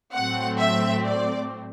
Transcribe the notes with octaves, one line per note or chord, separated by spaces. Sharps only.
A2 F#3 A3 C4 F#5
E5
D5